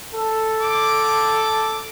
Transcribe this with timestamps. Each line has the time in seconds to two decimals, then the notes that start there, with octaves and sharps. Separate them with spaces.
0.14 A4
0.62 D6